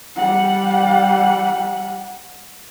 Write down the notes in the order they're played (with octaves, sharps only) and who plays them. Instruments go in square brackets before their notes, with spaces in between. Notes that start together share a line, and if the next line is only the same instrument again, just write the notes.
[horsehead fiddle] G3 F#5